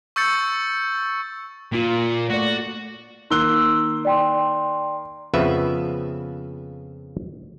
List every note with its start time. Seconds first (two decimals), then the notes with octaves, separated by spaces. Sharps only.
0.16 C#6 E6 G6 A6 C#7
1.72 A#2 A#3 F4
2.30 A3 F#4 D5
3.30 D#3 A#3 C6 E6 F#6 G7
4.05 D5 G5 C6
5.34 F2 C#3 F3 B3 B4 E5